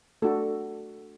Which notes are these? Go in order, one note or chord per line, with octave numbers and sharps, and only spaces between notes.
A3 D4 F#4 A4